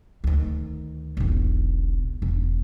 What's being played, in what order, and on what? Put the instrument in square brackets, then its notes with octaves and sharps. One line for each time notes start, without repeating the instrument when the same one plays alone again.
[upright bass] D2 D#3
E1 B1
E1